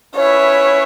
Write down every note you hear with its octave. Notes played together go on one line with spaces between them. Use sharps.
C#4 E4 B4 C#5 E5